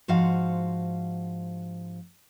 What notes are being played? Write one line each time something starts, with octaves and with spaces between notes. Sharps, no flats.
G#2 F3 F#4 C5 F5 F#5